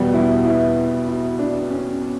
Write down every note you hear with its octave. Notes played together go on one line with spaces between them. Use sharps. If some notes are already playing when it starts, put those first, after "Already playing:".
Already playing: E2 B2 G3
E4
E4
E4
D4
C#4